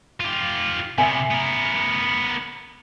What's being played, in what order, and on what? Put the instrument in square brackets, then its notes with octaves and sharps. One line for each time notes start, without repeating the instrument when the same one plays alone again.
[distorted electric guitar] F4 G4
[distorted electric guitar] C3 B3 [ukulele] E5 G#5
[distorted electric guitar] B3 A#4